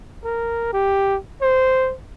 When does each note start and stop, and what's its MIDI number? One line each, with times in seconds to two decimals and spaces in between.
0.24 0.71 70
0.73 1.17 67
1.42 1.94 72